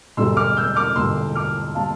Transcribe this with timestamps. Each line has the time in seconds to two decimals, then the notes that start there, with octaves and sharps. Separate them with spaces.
0.17 E1 D2 D3 G3 C6 E6
0.37 D6 F6
0.57 E6 G6
0.76 D6 F6
0.96 E1 D2 D3 G3 C6 E6
1.35 D6 F6
1.75 D3 G3 F5 A5